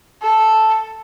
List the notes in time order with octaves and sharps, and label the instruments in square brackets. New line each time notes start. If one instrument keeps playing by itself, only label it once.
[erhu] A4